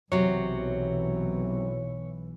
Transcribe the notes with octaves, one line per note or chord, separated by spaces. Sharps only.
B1 C3 E3 F#3 C#5